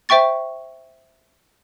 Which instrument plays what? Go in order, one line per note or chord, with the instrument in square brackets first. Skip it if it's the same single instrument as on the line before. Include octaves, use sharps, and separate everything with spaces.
[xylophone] C5 E5 G5 C#6 A6